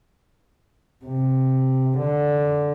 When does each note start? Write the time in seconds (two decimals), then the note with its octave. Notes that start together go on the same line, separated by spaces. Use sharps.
1.05 C3
1.98 D3